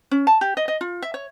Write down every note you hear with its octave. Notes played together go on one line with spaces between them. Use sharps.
C#4
A5
G4
D#5
D#5
F4
E5
C#5